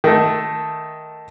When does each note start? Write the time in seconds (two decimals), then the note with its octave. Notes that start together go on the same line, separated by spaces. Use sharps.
0.04 D#3 A3